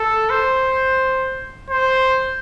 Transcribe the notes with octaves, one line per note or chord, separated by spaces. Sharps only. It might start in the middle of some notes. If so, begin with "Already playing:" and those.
Already playing: A4
C5
C5